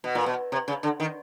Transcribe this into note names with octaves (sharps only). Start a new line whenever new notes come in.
B2
A#2
B2
C3
C#3
D3
D#3